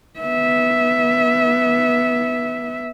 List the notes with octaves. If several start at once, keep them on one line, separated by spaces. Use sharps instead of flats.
B3 E5